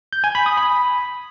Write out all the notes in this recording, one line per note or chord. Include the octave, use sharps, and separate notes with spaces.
G6
G#5
B5
D#6
B5